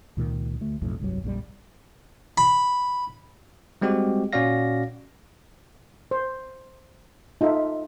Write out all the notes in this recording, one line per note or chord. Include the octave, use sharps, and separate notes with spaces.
C#2 A#2 D#3
D2 A3
B1 F2 A2
F1 C2 G2 F#3
A#1 F2 C#3 G3
B5
G3 G#3 C4 F#4 G4
A#2 C#4 F#4 D5 F5 A#6
C5
D#4 F4 A4 E5